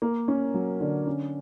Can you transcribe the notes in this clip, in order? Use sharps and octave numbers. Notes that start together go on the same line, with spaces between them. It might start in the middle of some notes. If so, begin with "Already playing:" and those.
A#3
C#4
F#3
D3
C#4